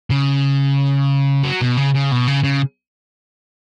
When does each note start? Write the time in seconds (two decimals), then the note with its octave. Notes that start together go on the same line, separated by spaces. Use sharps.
0.10 C#3
1.44 F#3
1.61 B2
1.77 C#3
1.94 C#3
2.11 B2
2.27 C#3
2.44 C#3